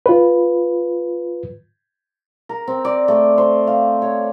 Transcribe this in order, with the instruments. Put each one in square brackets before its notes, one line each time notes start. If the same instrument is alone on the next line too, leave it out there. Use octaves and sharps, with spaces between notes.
[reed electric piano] F4 B4
[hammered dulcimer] A#4
C4
D5
A3
C5
F5
C#5